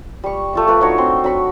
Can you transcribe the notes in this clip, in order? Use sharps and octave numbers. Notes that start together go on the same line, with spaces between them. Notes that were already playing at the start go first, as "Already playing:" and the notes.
G3 C#6
A3 F4 E5
F3 A3 B4 D6
D4 D#4 F#4 C#5
C4 C6
F#3 B5 C#6